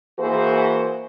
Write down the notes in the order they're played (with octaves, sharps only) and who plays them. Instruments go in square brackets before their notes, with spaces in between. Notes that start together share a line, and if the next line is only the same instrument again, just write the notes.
[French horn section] E3 A#3 F#4 G#4 C5